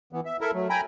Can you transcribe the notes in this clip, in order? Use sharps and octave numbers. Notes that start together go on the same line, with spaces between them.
E3 B3
E5
E4 A4 A#4 E5
F#3 A3
G5 G#5 A#5 B5